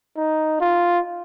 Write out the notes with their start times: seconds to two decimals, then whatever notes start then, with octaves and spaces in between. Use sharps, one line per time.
0.18 D#4
0.61 F4